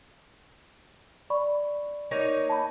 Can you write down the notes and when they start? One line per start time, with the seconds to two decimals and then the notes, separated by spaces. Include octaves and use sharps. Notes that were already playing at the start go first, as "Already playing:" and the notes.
1.30 D5 B5 C#6
2.11 A#3 D#4 C#5
2.50 A5 B5